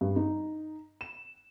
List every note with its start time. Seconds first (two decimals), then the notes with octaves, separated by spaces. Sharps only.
0.01 G2
0.16 D#4
1.01 E7